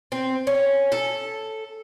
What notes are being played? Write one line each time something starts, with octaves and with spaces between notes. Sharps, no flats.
C4
C#4
A4